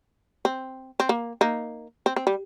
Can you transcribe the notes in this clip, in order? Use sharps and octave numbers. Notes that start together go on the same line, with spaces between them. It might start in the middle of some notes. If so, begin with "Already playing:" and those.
C4
C4
A#3
A#3 D#4
C4
C4
G3